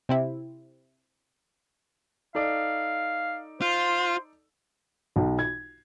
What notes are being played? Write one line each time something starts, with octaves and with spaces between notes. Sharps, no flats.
C3 C4 E4
D#4 A4 D5 F5
F4 C5 C6
B1
G#6